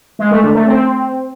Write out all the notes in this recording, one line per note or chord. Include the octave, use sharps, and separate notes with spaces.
G#3
A3
D3
A3
C4